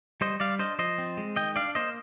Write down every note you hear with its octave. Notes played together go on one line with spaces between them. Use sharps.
G3 C5 D#5
G3 D5 F5
D4 C5 D#5
F3 C5 D#5
C4
G#3
D#3 D#5 G5
D4 D5 F5
A#3 C5 D#5